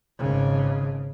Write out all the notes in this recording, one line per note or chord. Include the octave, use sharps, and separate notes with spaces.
G#1 C#3